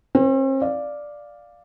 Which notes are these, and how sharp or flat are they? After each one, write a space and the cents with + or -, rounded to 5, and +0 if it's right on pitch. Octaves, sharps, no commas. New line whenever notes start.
C4 +45 B4 +0
D5 +0 F5 +0